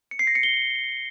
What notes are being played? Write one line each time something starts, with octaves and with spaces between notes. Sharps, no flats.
C#7
C7
A#6
C#7
G7